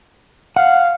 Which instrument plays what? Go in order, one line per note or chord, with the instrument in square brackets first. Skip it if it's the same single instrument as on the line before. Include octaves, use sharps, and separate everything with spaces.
[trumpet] F5 [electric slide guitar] F#5